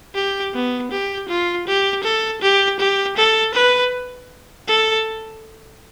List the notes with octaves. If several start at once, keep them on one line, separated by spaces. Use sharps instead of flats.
G4
B3
G4
F4
G4
A4
G4
G4
A4
B4
A4